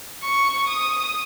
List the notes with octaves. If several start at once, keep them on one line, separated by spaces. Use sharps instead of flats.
C#6
D#6